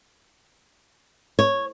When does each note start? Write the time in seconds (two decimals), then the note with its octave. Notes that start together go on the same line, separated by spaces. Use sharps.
1.39 C#5